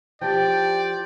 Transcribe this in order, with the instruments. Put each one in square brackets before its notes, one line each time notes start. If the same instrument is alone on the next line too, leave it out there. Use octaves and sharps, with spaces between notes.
[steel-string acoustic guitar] F3 E4 G4 [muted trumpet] D5 [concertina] G5